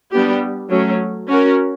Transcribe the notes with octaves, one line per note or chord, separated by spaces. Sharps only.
G3 B3 D4 G4
F#3 A3 C#4
C#4 F#4 A#4